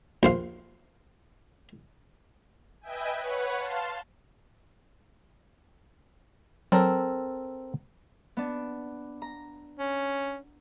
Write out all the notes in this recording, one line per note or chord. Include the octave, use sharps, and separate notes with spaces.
A#1 C5 F5
B4 D#5 E5 G5 G#5
B4 C#5 F#5
F5 A5 C6
F#3 C4 A4 A#4
B3 D4
A#5
C#4